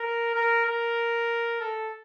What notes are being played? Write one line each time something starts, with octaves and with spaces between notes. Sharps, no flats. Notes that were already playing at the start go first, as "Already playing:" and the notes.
Already playing: A#4
A#4
A#4
A4